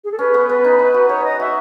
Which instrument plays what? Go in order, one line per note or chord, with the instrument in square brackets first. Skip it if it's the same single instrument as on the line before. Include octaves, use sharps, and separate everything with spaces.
[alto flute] G#4
A4
[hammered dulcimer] C#4 [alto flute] B4
[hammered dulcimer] B3
[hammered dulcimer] B3 [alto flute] B4
[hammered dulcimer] D#4
D#4
F#4
[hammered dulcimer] G#4 [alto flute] C#5
[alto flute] D#5
[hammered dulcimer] F#4 [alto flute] E5